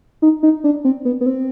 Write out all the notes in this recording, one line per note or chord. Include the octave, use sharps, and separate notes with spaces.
D#4
D#4
D4
C4
B3
B3
C4